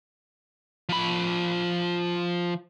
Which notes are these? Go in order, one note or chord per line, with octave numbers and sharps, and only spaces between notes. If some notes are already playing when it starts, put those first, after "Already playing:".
F3 B5